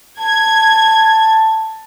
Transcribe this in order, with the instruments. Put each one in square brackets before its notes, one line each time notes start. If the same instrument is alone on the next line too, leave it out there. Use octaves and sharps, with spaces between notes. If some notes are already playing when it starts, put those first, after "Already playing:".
[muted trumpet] A5 [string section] G#6